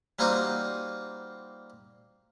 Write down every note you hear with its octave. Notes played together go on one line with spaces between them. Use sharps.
G3 A#3 C4 D#4 F4 F#4